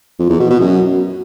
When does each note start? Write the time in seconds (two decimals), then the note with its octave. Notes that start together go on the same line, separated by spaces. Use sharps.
0.19 F2
0.29 E2
0.40 B2
0.50 B2
0.60 F#2